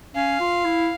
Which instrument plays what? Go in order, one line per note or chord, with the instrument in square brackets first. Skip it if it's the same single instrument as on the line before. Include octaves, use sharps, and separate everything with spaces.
[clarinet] C#4 [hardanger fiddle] F5
[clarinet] F4
E4